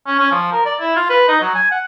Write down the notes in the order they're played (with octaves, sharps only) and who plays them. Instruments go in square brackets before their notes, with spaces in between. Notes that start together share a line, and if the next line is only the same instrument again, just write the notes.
[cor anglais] C#4
C#4
F3
A#4
D5
E4
F4
B4
D#4
F#3
G#5
F#5